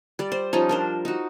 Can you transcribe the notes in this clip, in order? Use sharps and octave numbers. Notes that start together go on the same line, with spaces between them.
G3 D5
C5
F3 G3 C#4 D#4
D4 A#4 C5
D#4 F#4